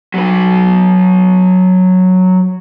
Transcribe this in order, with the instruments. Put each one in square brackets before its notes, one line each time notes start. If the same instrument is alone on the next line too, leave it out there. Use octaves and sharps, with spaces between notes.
[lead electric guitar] F#3 B4